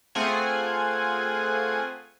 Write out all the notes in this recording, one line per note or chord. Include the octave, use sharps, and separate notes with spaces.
A3 C4 F4 G#4 F#5 G#5